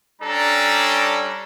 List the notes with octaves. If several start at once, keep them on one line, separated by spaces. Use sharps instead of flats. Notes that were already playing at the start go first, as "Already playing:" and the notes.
G3 C#4 D4 A4 A#5